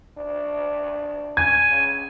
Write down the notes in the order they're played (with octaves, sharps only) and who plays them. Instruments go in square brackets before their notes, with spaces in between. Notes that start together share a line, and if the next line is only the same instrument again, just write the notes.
[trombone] D4
[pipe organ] G#5 [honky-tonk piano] G#6
[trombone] C#3